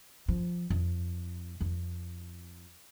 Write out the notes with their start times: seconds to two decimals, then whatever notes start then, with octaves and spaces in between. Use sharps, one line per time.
0.28 F3
0.70 F2
1.60 F2